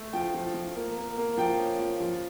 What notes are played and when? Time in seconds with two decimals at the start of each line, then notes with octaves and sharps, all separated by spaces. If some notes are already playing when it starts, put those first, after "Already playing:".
Already playing: A3
0.13 F3 G5
0.34 F3
0.54 F3
0.76 A#3
0.97 A#3
1.18 A#3
1.37 F3 G5
1.58 C#4
1.80 F3
2.00 F3